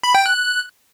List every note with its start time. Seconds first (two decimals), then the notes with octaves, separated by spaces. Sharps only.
0.03 B5
0.15 G5
0.26 F#6